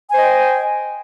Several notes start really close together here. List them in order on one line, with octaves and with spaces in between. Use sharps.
G#5 C5 D#5 G5